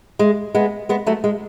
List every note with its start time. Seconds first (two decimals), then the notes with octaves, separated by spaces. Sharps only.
0.19 G#3
0.55 G#3 B3
0.89 G#3 B3
1.07 F#3 A3
1.24 G#3